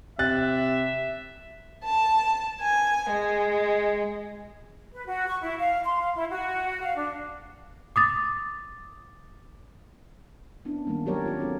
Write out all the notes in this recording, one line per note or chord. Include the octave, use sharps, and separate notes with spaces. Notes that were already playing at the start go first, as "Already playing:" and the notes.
C3 E5 F#6 A6
A5
G#5
G#3
B4
F#4
C#6
E4
F5
C6
F5
E4
F#4
F5
D4
D6 D#6 A6
B3 C#4 D4 E4
D#3 G3 G#3 A#3
F#3 G3 G4 A#4 C#5 D5
C#4 F4 G4
C4 D4 F#4 A4